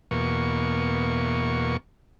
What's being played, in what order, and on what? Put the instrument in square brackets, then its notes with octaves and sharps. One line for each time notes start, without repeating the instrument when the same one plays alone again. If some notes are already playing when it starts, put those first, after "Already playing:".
[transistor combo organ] E2 B2 A#3 C#6